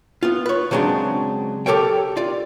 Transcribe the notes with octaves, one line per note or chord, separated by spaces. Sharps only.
B3 F4
B4 C#5
C#3 F#3 G#3 C4 D4
G4 A4 A#4 C#5 G5
F4 D5